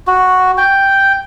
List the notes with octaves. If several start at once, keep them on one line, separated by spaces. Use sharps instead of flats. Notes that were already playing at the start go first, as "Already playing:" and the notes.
F#4
G5